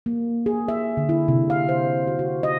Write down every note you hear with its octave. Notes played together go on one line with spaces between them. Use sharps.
A#3
G#4
E5
D3
E4
C3
F5
C5
F#4
F#4
D#5